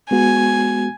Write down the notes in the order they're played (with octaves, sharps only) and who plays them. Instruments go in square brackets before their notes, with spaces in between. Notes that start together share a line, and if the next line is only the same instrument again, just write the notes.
[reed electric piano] G#3 B3 F#4 [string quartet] G#5